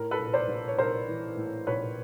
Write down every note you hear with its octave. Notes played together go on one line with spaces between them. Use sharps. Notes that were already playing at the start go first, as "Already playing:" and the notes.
Already playing: A2 A#4
A4 B4
A#1
C5 D5
A#1
C#5
A#1 A#4 C5
E3
A2
A#1 B4 C#5